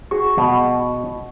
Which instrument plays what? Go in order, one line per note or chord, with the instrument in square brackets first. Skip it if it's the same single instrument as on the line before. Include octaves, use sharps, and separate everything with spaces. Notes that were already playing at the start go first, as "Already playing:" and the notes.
[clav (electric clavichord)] F#4 G#4 [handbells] C#6
[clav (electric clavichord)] B2